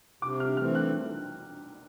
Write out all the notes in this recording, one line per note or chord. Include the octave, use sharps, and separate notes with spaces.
C3 D6
F6
E3 A3 C4 F6
F#6